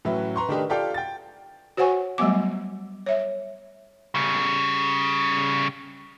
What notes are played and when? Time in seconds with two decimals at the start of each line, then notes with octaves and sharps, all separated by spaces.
0.05 A2 E3 F#3 C#4 B4 E5
0.36 B4 A#5 C6 C#6
0.49 D#3 A3 D4 D#4 G4 B4
0.69 F4 G4 A4 D5 F5 G5
0.94 G5 A6
1.77 F#4 C5 C#5 F#5 G#5 C#6
2.18 F#3 G3 A3 B3 D6
3.06 C#5 E5
4.15 C#3 G3